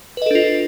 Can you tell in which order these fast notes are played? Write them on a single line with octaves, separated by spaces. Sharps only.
B4 D#5 A4 D4 F4